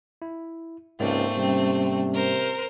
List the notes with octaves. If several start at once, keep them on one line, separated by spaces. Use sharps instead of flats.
E4
C#2 G#2 A3 A#3 C4 D5
C3 G3 C#4 G5
A#4 C5